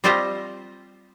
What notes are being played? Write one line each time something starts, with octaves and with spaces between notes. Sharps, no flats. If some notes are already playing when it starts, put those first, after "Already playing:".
G3 C4 F4 G4 C5 D#5